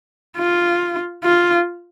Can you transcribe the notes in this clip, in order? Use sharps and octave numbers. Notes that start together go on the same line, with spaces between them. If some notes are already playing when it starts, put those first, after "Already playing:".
F4
F4